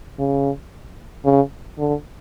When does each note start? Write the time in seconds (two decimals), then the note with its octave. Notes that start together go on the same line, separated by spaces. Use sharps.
0.19 C#3
1.24 C#3
1.78 D3